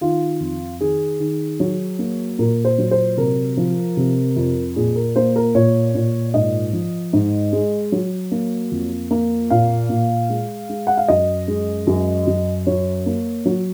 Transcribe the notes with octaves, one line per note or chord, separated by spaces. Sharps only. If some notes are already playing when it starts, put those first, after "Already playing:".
D#3 F4
F2
D#3 G#4
D#3
F#3
A#3
A#2 A#4
C5
F#3
C5
C3 A#4
F3
C3
F2
A#2 G#4
A#4
A#3 C5
A#4
A#2 C#5
A#2
G#2 D#5
F3
G#2
G#3
F#3
A#3
F2
A#3
A#2 F5
A#2
G#3
G#3
F#5
F5
F#2 D#5
G#3
F#2
F#2
F#3 C#5
A#3
F#3